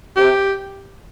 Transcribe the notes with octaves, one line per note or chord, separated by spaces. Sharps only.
C3 G4